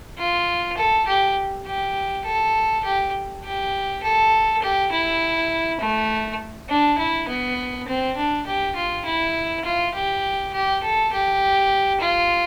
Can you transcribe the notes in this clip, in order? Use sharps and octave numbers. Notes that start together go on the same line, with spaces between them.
F4
A4
G4
G4
A4
G4
G4
A4
G4
E4
A3
D4
E4
B3
C4
D4
G4
F4
E4
F4
G4
G4
A4
G4
F4